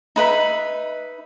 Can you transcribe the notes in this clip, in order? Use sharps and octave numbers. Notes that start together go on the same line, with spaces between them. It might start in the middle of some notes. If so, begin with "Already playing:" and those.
D#4 B4 E5 B5